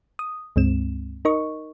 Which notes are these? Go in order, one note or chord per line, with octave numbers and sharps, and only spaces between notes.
D#6
C#2 G2 G#3 C4 E7
D#4 A#4 D#5 C#6